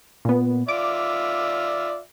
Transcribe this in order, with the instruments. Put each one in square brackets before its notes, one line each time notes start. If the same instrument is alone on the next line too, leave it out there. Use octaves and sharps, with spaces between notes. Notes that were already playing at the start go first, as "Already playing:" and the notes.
[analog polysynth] A#2 B3
[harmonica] F4 D5 E5 [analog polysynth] D6